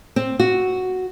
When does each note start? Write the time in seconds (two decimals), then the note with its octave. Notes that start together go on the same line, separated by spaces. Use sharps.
0.16 C4
0.40 F#4